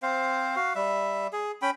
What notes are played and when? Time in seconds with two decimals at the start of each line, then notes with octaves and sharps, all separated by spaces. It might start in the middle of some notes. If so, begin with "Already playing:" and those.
0.03 C4 C5 F5
0.56 F#4 F5
0.75 G3 E5
1.33 G#4
1.62 C#4 G5 B5